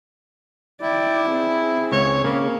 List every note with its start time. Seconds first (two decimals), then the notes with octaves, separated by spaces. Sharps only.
0.82 E4 D5 G5
1.32 C4 G#4
1.92 C#2 C#5
2.24 C#3 A#3